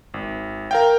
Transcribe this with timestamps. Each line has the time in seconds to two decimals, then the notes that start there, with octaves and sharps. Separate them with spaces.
0.14 G#1
0.71 A#4 F5 G5